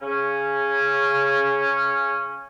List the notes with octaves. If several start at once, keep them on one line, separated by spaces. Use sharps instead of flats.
C#3 C#4